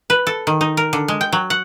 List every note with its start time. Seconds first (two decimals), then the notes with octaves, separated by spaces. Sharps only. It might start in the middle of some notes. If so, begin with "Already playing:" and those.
0.10 B4
0.27 A4
0.47 D#3
0.61 D#4
0.77 A#4
0.93 D3
1.08 G#3
1.21 G5
1.32 F#3
1.50 F#5